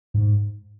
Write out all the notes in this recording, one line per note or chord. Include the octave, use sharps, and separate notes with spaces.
G#2